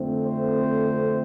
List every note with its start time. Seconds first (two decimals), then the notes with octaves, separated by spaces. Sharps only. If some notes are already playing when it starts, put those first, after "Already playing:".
Already playing: F2 D3 A3 C4
0.25 C5